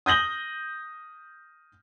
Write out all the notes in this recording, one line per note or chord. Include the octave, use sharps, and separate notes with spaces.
D#6 G6 A#6 F#7 G7